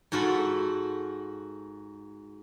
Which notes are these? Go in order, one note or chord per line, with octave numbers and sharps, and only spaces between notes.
G#2 F4 F#4 A4 B5